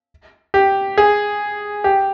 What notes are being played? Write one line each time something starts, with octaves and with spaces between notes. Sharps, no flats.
G4
G#4
G4